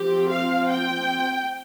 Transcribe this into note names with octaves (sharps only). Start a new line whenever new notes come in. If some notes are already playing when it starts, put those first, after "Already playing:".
Already playing: F3 C4 G4
F5
G5